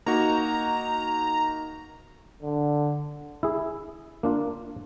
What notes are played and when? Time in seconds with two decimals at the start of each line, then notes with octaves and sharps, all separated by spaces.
0.06 A#3 D#4 F#4 A#5
2.43 D3
3.43 E4 G#4
4.23 A#3 D4 F4